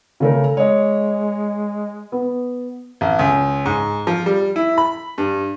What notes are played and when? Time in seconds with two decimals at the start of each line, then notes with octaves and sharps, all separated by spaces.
0.20 C#3 A3 A#4
0.57 G#3 C#5 D#5
2.12 B3
3.01 A1
3.19 C#2
3.66 G#2
4.07 F3
4.26 G3
4.56 E4
4.78 B5
5.18 G2